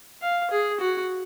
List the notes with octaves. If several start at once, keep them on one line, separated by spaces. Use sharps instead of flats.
F5
G#4
F#4